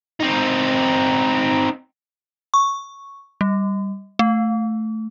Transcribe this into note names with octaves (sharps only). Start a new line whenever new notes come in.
C4 D#4
C#6
G3
A3